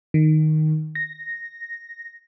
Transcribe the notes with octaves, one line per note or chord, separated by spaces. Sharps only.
D#3
A#6